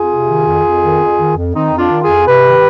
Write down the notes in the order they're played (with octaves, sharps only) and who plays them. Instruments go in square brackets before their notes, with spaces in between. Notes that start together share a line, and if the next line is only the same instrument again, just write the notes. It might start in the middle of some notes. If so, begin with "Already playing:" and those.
Already playing: [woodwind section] F2 F4 G#4
C3
D#3
F2
F2
D#3
F2
D#3
F2
D#3 C4 D#4
F2
D4 F4
D#3
F4 G#4
F2
C3 G4 B4
D#3